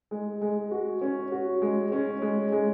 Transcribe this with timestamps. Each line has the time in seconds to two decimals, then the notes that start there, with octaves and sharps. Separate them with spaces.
0.11 G#3
0.41 G#3
0.71 F#4
1.01 C#4
1.32 F#4
1.62 G#3
1.92 C#4
2.22 G#3
2.52 G#3